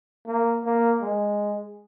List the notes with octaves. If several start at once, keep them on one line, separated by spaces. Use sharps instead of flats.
A#3
A#3
G#3